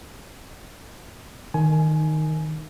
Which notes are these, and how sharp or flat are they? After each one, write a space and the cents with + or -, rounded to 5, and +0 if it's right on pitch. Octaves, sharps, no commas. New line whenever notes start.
D#3 -5 G#5 +20